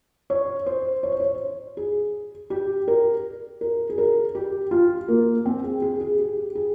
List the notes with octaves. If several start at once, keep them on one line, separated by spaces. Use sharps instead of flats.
C#5
C5
C#5
C5
C#5
G#4
G4
A#4
A#4
G#4
A#4
G4
F4
A#3
C4
G#4
G#4
G#4
G4
G#4